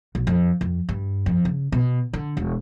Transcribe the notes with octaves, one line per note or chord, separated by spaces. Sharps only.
B1
F2
F2
G2
F2
C#3
B2
D3
E1